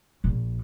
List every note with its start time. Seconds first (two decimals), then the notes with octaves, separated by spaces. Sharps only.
0.24 A#1